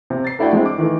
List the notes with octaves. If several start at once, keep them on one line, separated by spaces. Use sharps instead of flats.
C3
A6 C7
A3 D4 E4 F#4 D5 G5
G#3 C4 D4 E4
D6
D#3 E3 A3